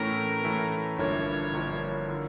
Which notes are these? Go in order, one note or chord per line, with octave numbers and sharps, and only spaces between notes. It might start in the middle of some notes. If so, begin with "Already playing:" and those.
Already playing: A2 E3 A3 C#4 A#4
A2 E3 A3 C#4
G1 G2 F3 A#3 E4 C#5
G1 G2 F3 A#3 E4
D3 F3